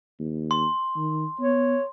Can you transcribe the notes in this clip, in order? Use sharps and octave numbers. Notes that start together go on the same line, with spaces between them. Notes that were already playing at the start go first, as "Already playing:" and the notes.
D#2
C6
D#3
B3 C#5